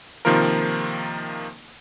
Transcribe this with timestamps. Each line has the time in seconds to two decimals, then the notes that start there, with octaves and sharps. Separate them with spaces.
0.25 C3 D#3 F3 A#3 F4 A#4